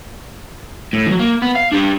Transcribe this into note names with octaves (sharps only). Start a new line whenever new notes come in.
A2
E3 F#3
A#3
B3
F5
D4 G4